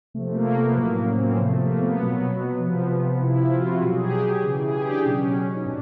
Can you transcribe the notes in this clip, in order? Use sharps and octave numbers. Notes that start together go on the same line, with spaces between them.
C3 F3 A3
A3
A#3
B3
A2 F#3 A#3
C#4
C4
B3
A#3
C3 F3 A3
A3
A#3
B3
B2 F#3
C3 F3
C3 F3 E4
F4
F#4
B2 F#3 G4
G#4
G4
C#3 E3
G#4
G4
D4
D4
B2 F#3 C#4
D#4
A2 D4